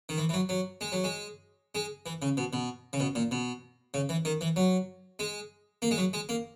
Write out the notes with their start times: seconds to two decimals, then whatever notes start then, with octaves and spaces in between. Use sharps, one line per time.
0.09 D#3
0.18 E3
0.29 E3
0.34 F#3
0.49 F#3
0.81 G#3
0.92 F#3
1.04 G#3
1.75 G#3
2.06 E3
2.22 C#3
2.37 B2
2.53 B2
2.93 C#3
3.00 B2
3.15 A#2
3.31 B2
3.94 C#3
4.09 E3
4.25 D#3
4.41 E3
4.56 F#3
5.19 G#3
5.82 A#3
5.91 G#3
5.98 F#3
6.13 G#3
6.29 A#3